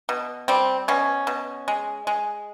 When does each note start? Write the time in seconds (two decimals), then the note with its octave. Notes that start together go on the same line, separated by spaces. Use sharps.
0.09 B2
0.48 G3 C4
0.88 B2 C#4
1.27 B2
1.68 G#3
2.07 G#3